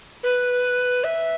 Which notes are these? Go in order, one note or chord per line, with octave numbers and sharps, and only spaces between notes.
B4
E5